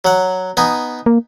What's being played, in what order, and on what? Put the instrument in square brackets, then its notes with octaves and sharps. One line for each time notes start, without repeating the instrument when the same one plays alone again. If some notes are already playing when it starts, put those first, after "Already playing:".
[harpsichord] F#3 F#5
B3 D#4 G#5
[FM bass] A#3